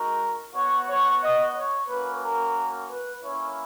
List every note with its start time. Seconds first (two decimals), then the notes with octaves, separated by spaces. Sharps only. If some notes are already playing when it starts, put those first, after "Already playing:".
Already playing: G#3 D#4 F#4 A#4
0.55 B3 F#4 C#5
0.88 C#5
1.21 D#5
1.55 C#5
1.88 A#3 C#4 F#4 B4
2.22 A#4
2.88 B4
3.23 A#3 C#4 E4 C#5